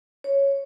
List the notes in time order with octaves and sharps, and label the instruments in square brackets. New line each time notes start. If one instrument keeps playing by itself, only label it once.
[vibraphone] C#5